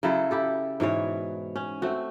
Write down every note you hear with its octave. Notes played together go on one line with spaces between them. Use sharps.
C#3 F#3 E4 A4
E4 G4 A4
G#2 B2 E3 C#5
C#4
A3 C4 F#4